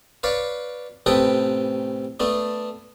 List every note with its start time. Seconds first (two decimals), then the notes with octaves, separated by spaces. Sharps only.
0.23 B4 C#5 D5 F5
1.06 A1 C3 A4 B4 G5 D#6
2.20 A3 B3 D4